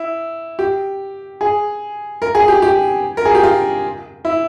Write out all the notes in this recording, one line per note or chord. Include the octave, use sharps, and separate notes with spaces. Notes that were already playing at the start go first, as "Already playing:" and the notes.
Already playing: E4
G4
G#4
A#4
G#4
G4
G4
A#4
G#4
G4
F4
E4